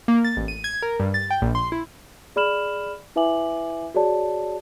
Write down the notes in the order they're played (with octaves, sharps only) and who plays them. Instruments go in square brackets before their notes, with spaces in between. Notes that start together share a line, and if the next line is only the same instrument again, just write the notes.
[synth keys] A#3
A6
A1
D#7
G#6
A#4
G2
A6
G5
A#1
C6
E4
[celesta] G#4 D5 B5 F6 E7 F#7
E4 B4 E5 G#5 D6 F#7
F#4 G#4 C#5 D5 A5